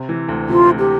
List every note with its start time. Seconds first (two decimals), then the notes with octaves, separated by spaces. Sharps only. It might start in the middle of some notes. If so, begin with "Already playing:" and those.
Already playing: C3
0.09 E3
0.29 D2
0.49 C3 F4
0.69 D2
0.79 G4